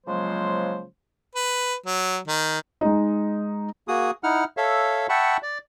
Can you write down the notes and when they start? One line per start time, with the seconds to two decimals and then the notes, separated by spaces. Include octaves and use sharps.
0.06 C#3 F3 F#3 G#3 A#3 C5
1.36 B4
1.86 F#3
2.28 D#3
2.81 G#3 D#4
3.88 A#3 F#4 G#4 D#6
4.24 D#4 E4 F#5 F6
4.57 A4 C#5 E5 F5
5.09 E5 F#5 G5 A5 B5 C#6
5.43 D5